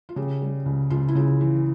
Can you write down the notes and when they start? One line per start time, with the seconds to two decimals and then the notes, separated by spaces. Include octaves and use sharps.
0.09 F4
0.16 C#3 G4
0.42 G3
0.66 C#2
0.90 C#2 F4
1.08 E4
1.15 C#3 F4
1.41 E3